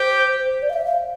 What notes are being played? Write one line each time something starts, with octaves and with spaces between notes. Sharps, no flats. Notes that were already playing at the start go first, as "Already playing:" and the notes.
Already playing: G4 C5
D5
F5
E5
F5